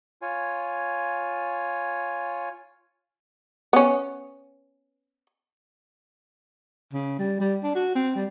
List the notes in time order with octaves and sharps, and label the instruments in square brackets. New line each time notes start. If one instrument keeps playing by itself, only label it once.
[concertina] F4 C#5 G#5
[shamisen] B3 C#4
[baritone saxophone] C#3
G3
G3
D4
F#4
C4
G3